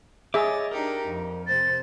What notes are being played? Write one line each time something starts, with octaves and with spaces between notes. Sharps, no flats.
G#4 C#5 D#5 E5 D6 A6
D4 D#4 G4 A#4
F2
C3 C5 A6